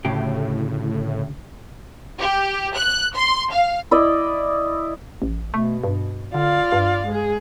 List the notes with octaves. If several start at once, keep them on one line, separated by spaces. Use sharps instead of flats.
D2 A2 C#3 G4
G4
F#6
C6
F5
E4 D5 D#5
A1
B2 A3
G2
D3 F4 D5 F5
G2
G#3 G#4